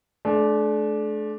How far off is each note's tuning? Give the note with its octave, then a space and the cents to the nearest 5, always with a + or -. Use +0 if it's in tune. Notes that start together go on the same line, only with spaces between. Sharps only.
A3 -40 D4 +0